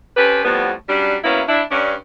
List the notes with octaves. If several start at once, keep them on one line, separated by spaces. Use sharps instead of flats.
C4 C#4 G4 A4 B4
F2 A2 F3 G3 B3
F#3 G3 C#4 D4
F#3 A#3 B3 C#4 E4 E5
D4 E4
G2 C#4 D4